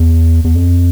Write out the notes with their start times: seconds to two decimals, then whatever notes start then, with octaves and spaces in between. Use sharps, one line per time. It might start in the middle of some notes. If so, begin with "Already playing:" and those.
Already playing: E2
0.44 E2
0.55 F2